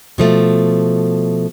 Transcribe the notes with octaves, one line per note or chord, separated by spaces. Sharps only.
B2 F3 A3